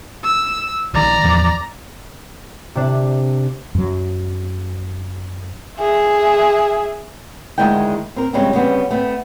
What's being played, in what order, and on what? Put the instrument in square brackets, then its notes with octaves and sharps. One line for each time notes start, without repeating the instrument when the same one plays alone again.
[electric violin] E6
[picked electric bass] A#1 D#3 [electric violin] D5 A#5
[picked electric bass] D1 E2 F3
[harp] C3 D4
[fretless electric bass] F#2 F#3
[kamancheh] G#4 E5
[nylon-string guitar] D2 D#3 G#3 E4 G5
C4 A#4
C#3 F3 G3 G#3 C4 C#4
C#3 G3 B3 C4
A3 B3 C4